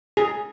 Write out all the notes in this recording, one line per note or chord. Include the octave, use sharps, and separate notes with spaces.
G#4